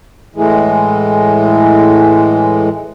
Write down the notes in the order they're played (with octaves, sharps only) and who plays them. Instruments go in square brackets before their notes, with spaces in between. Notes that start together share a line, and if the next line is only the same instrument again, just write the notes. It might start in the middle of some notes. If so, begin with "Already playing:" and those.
[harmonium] A2 E3 G#3